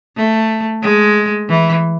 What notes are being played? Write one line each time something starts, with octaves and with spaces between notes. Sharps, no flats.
A3
G#3
E3